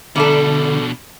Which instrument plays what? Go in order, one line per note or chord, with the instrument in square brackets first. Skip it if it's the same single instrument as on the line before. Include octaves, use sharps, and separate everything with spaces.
[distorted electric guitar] B2 D4 [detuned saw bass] D3 [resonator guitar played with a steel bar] G3 A3 A4